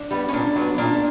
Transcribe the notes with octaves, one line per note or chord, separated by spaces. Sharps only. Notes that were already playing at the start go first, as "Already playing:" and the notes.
Already playing: D4
G3 B3
C#4
A#2 D4
F#3 B3
A#2 D4